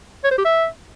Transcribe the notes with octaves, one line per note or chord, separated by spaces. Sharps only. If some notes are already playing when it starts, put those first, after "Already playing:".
C#5
C5
G4
E5